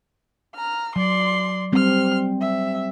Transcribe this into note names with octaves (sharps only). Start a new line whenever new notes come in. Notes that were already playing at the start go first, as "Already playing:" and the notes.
A#5 F6
F#3 D5 C6
G3 C4 C6 F6
E5